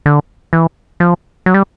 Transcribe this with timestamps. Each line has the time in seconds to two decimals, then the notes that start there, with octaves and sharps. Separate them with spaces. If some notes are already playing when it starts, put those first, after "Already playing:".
0.06 D3
0.53 E3
1.00 F3
1.46 F#3
1.54 G3